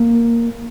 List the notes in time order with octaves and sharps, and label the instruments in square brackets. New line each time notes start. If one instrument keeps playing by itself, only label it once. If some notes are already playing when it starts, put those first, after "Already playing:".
Already playing: [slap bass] A#3